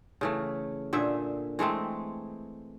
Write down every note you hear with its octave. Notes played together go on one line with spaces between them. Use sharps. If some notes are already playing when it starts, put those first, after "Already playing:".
C#3 E3 A3
A#2 D3 G#4 E5
E3 G#3 A3 C4